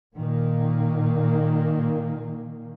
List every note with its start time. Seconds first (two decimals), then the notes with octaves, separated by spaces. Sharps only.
0.16 A#2 D#3 A#3